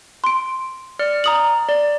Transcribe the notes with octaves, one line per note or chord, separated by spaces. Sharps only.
C6 D7
D5 F6 C#7
A#5 D#6 F#7
D5